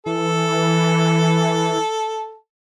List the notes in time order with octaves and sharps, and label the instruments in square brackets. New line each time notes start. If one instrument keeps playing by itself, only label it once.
[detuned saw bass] E3 [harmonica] A4